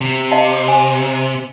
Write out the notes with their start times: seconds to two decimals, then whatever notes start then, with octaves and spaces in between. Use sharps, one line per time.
0.01 C3
0.31 D#5 F5 A5
0.68 G#5